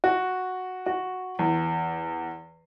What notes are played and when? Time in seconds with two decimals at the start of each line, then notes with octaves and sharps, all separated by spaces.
0.04 F#4
0.86 F#4
1.39 E2